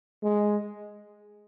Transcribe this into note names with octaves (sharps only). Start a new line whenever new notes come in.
G#3